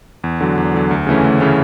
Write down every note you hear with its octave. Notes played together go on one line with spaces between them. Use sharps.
E2
D3 F#3
E2
D3 F#3
D2
C#3 E3 A3 C#4
D2
C#3 E3 A3 C#4